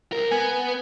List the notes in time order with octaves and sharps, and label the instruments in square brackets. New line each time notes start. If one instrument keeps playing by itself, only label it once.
[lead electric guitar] C2 A#4
[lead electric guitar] B3 [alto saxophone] G#5